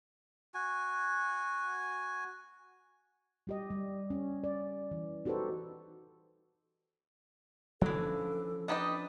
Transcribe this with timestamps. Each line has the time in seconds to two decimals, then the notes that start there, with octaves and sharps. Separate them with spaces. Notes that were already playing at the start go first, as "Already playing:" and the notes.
0.54 F#4 G#5
3.47 G3 G4 D#5
3.70 G3
4.10 C#4
4.44 D5
4.91 E3
5.25 D#4 F#4 G4 A4 B4 C5
7.81 D3 E3 F3 C#4 A4
8.68 D4 D#4 G4 B4 D#5